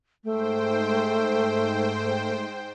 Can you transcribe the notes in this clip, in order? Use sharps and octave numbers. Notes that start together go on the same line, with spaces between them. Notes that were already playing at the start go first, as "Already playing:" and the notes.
G#2 A3 C5 G5